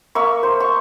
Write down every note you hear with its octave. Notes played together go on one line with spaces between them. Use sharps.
A#3 E5 C#6
C5
C#6